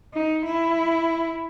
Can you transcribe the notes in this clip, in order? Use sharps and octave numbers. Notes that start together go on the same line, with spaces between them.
D#4
E4